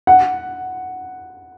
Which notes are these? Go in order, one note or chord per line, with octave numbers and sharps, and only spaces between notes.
F#5